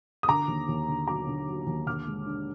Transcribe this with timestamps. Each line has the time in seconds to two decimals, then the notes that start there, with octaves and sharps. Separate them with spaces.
0.23 D#6
0.28 D3 A#5 D6
0.48 D#2
0.69 D#2
0.88 D3
1.07 F#3 A#5 D6
1.27 D3
1.47 F#3
1.67 D#2
1.87 D3 D6 F6
2.07 G#3
2.27 D4